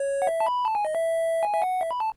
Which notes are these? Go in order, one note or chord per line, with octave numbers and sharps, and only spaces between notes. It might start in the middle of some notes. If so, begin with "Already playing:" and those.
Already playing: C#5
F#5
E5
A5
B5
A5
G#5
D#5
E5
G#5
E5
F#5
E5
B5
A5